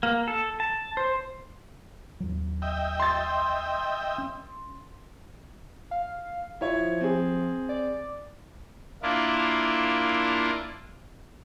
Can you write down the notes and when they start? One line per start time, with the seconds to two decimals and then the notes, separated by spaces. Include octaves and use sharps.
0.03 A#3
0.28 A4
0.60 A5
0.97 C5
2.20 D#2 F#3
2.62 D#5 E5 G5
3.00 C6 A6
4.18 C#4
5.91 F5
6.61 F3 E4 C#5
7.01 C4 G#4
7.69 D5
9.03 A#3 D4 E4 F4